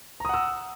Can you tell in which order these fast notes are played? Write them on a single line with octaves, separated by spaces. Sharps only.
A#5 D#6 F#5 E6